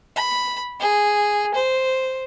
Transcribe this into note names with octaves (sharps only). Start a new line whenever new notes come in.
B5
G#4
C5